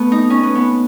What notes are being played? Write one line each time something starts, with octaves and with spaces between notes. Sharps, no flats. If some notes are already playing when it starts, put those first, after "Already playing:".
Already playing: A3 B3
D#4
C#4
B3
B3